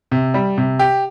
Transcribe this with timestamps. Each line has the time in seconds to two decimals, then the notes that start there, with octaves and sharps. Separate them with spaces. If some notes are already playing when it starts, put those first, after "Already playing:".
0.11 C3
0.34 G3
0.57 C3
0.79 G4